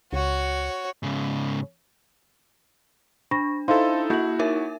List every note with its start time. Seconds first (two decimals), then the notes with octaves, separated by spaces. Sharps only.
0.13 C#2 F#4 C#5
1.03 G#2 C#3
3.31 D4 B5 C#6 A#6
3.68 D#4 E4 A4 C5 F5 C6
4.10 A#3 E4 F#4 G6 F#7
4.39 D#4 A#4 E5